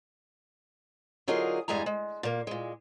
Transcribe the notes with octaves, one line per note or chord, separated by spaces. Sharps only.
D3 F#3 D#4 F4 G#4 A#4
E2 G2 G3 G#3 G#5 A#5
G#3
A#2 A#3
A#2 G#3